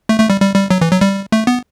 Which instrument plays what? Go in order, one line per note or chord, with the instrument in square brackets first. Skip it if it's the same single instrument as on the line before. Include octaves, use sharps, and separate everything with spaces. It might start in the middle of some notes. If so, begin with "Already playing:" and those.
[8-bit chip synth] A3
A3
G3
G3
G3
F#3
E3
F#3
G3
A3
B3